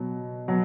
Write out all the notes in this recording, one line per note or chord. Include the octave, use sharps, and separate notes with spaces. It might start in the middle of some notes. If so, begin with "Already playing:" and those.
Already playing: B2 F#3
B2 F#3